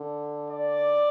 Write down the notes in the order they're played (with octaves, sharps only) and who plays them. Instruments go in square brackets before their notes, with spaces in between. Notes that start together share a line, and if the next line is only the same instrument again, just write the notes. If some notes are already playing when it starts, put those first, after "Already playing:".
Already playing: [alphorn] D3
[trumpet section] D5